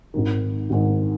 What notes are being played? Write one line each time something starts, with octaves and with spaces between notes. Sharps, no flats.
G#1 G#2 D#3
G#1 G#2 D#3